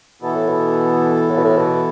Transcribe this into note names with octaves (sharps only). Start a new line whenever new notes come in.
B2 E3 B3 E4 A4
A2
B2
A2
B2
A2
B2